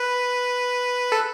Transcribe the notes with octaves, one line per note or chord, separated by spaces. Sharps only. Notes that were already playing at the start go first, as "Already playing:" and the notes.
Already playing: B4
A4